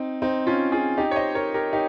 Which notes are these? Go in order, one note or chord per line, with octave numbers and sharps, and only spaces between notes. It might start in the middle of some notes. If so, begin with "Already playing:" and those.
Already playing: C4 D#4
C4 D#4
C#4 F4
F4 G#4
D#4 G4
C#5
C5 D#5
A#4 C#5
G4 A#4
D#4 G4